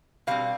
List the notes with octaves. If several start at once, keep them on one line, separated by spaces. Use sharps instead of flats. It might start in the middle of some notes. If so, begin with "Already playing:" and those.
B2 G3 C4 F5